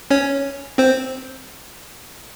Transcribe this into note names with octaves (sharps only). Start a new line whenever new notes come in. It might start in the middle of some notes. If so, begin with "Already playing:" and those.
C#4 C#5
C4 C5